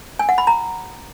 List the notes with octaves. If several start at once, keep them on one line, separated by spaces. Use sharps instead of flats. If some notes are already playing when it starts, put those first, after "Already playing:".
G#5
F#5
B5
A#5